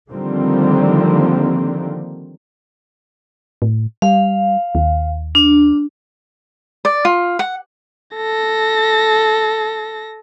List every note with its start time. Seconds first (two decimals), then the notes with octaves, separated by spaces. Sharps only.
0.12 D3 D#3 F3 G3 A#3 C4
3.62 A2
4.02 G3 F5
4.75 D#2
5.35 D4
6.85 D5
7.05 F4
7.39 F#5
8.16 A4 A#6